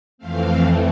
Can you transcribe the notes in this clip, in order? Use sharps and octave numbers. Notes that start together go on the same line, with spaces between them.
F2 E3 A3 C4 F5